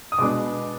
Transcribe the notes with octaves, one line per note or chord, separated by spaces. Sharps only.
D#6
B2 G#3 B3 D4 D6